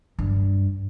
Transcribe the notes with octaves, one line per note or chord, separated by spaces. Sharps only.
G2